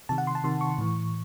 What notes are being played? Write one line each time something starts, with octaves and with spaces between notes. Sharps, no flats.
C3 D#3 A5
F#5
C6
A5
C3 D#3 C6
C#6
A2 E3